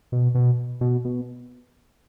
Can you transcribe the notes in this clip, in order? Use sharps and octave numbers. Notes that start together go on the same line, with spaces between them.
B2
B2
B2
B2